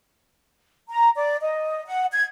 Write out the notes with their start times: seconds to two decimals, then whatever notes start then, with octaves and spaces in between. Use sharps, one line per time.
0.90 A#5
1.16 D5
1.41 D#5
1.87 F#5
2.12 G#6